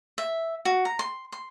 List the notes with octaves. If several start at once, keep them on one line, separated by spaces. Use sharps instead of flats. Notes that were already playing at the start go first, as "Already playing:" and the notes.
E5
F#4
A#5
C6
C6